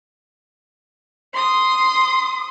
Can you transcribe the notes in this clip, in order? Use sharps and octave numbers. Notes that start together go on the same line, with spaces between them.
C6 D#6